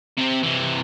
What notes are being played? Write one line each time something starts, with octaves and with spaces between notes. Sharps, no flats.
C3 C4
C3 E3